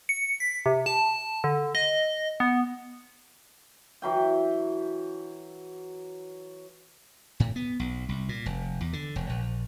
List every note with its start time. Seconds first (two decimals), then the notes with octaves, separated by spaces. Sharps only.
0.09 C#7
0.40 B6
0.66 C3
0.86 A5
1.44 D3
1.75 D#5
2.40 B3
4.02 E3 F#3 G5
7.40 A2
7.56 B3
7.80 B1
8.09 C2
8.29 A#2
8.46 F1
8.80 E2
8.93 D3
9.16 E1
9.30 A#1